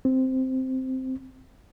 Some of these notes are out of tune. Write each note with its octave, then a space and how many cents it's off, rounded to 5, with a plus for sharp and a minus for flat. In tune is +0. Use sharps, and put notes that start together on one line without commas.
C4 -5